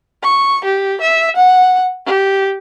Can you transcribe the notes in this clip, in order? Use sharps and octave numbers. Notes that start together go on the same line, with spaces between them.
C#6
G4
E5
F#5
G4